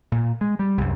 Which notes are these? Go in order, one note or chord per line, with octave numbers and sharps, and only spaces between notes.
A#2
G#3
G3
C2 F#2